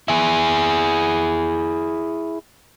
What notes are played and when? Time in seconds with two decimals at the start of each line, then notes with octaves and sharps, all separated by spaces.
0.08 E4 G#4